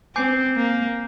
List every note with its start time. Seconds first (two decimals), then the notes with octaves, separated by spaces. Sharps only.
0.16 C4 G#5 D6 G6 C7
0.56 A#3